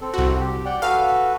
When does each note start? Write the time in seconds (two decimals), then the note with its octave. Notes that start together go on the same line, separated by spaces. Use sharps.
0.01 C4 A4
0.14 C2 F#4
0.40 G4
0.65 D5 F#5 G5
0.82 F#4 A4 B4 F5